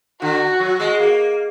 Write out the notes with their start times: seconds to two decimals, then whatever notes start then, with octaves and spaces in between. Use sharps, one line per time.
0.21 D3 F#4
0.60 F#3
0.80 G#3
1.00 A#3